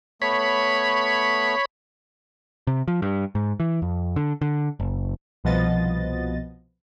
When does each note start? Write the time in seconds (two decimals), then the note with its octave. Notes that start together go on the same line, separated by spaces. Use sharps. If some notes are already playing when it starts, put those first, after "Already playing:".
0.22 A3 B3 C#5 B5
2.67 C3
2.88 F3
3.02 G2
3.35 G#2
3.60 E3
3.82 F2
4.16 D3
4.42 D3
4.80 F#1
5.44 C2 B2 F3 B3 D#5 A6